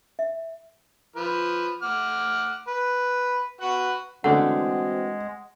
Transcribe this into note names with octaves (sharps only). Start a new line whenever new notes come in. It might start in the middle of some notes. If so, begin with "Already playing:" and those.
E5
F3 B4
F#5 D6 F6
B4
F#4 B4 F#5
D3 E3 G#3 A3 C4 F#4 F#5